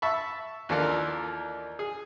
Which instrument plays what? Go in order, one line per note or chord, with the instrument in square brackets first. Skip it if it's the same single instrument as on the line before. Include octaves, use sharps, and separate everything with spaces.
[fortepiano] E5 A5 B5 C#6
D#2 E3 D4 F4 A4 A#4
G#4